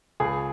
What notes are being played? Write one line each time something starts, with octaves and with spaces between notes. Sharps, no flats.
C#2 G#4